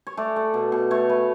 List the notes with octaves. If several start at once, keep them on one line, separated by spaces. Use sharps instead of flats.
C#5
A3 D5
A3
B2
B2
A3 C#5
A3 B4